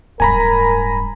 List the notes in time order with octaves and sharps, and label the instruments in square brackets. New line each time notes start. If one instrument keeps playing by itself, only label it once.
[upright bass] D1 G2 [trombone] A#4 [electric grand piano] G#5 A#5 B5